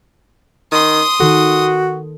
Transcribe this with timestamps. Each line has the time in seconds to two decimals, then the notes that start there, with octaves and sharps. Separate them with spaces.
0.72 D#3 C6 D#6
1.20 D#3 F#4 A4